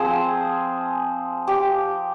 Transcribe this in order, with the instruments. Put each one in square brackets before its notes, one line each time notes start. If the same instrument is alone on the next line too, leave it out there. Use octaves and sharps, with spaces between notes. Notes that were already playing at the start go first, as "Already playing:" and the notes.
Already playing: [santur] F3 C4 F4 G#4 C5
G4